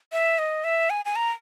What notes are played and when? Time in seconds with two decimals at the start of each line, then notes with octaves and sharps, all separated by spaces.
0.13 E5
0.39 D#5
0.64 E5
0.90 G#5
1.05 G#5
1.16 A#5